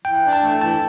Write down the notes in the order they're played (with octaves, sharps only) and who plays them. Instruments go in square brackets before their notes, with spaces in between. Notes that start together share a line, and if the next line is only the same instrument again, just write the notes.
[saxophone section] E3 [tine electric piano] G5
[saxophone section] D4
[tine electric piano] A5
[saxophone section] A3
[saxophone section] E3 [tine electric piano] A5